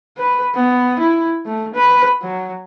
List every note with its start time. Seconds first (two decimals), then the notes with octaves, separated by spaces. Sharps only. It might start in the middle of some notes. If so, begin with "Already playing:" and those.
0.18 B4
0.54 B3
0.99 E4
1.45 A3
1.74 B4
2.22 F#3